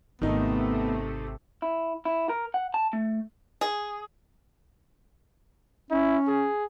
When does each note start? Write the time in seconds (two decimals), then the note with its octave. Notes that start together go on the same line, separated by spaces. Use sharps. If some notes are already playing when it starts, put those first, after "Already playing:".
0.22 G#1 C3 D#3 A3 B3 D#4
1.62 E4
2.05 E4
2.29 A#4
2.54 F#5
2.74 A5
2.93 A3
3.61 G#4
5.91 C#4 E4
6.28 G#4